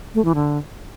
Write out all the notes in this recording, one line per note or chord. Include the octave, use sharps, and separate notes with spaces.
A3
E3
D3